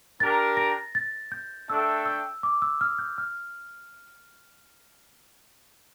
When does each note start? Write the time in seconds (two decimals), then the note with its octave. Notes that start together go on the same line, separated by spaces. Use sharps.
0.20 D4 G4 A#4 A6
0.57 A#6
0.95 A6
1.32 G6
1.69 A3 D4 A4 E5 G5 E6
2.06 E6
2.43 D6
2.62 E6
2.81 F6
2.99 G6
3.18 F6